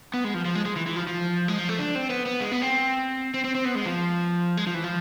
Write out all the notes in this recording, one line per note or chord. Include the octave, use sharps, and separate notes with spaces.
B3
G#3
F3
F3
G#3
G#3
E3
E3
F3
F3
G#3
F3
A3
D4
C4
B3
B3
G#3
B3
C4
C4
C4
C4
B3
G#3
F3
G#3
F3
E3
F3